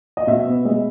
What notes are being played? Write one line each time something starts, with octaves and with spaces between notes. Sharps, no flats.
D#5
B2 E5
B3
G#3 D#5